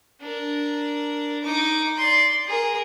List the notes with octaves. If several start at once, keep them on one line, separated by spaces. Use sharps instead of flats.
D4 A#4
D#4 D6
D5 C6
G#4 A#4